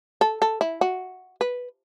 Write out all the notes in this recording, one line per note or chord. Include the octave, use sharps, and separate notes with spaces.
A4
A4
E4
F#4
B4